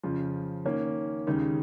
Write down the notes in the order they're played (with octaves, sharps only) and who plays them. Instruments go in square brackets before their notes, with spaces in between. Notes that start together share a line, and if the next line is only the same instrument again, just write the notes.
[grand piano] F2 C#3 F3
D#3 A#3 C#4
D#2 C#3 G#3 D#4 A#4